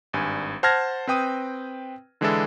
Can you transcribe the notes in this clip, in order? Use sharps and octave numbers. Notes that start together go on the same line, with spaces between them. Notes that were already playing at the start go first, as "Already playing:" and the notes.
G#1 G2 G#5
C5 F#5 A5 F6 G#6 A#6
C4 B4 G5 D#6 D#7
D3 E3 G#3 D4 E4 A4